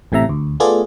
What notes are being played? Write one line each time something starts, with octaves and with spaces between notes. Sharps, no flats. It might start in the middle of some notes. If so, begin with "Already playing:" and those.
A1 A2 C3 E5 A#5
D2
A3 B3 F4 G#4 D5